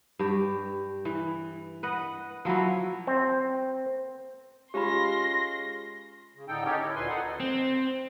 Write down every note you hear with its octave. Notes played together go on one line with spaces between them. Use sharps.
G2 G4
E3
B4 D#5 F#5
F3 F#3 C#4 E4
C4
G#3 C#4 F4 G4 B5 C6 A#6
C#3
A2 D3 D#4 A4 G5
C#4 D#4 G4 A4 A#4 C#5
E4
D2 A#2 B4 G#5 C6
D#4 A4 F#5
C4